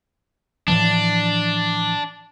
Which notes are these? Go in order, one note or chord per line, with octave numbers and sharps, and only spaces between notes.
A2 E3 F3 D4